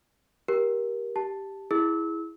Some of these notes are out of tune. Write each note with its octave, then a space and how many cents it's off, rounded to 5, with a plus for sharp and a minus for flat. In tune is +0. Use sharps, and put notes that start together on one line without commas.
G4 +0 A#4 +20
G4 +0 A5 +0
E4 +0 G#4 +0 E6 -30